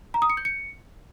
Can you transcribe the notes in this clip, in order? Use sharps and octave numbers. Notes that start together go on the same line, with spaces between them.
A#5
D#6
C#7
G6
C#7